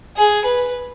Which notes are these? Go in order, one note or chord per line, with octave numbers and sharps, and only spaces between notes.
G#4
B4